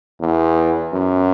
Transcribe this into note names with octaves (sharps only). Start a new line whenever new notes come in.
E2
F#2